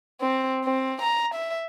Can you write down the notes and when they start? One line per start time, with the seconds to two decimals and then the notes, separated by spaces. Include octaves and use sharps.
0.21 C4
0.65 C4
1.02 A#5
1.35 E5